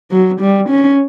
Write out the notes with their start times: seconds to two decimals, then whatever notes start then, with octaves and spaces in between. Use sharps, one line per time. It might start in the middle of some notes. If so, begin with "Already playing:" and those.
0.11 F#3
0.40 G3
0.69 C#4